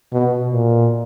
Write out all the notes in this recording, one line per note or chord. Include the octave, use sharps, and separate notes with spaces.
B2
A#2